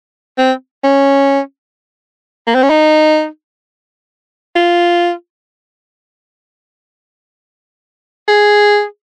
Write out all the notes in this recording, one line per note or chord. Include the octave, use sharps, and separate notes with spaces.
C4
C#4
A#3
C4
C#4
D#4
F4
G#4